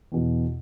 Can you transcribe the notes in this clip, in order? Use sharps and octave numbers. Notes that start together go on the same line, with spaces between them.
E2 B2